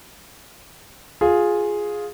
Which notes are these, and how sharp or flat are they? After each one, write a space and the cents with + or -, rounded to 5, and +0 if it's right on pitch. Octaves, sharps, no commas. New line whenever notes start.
F4 +15 G#4 +0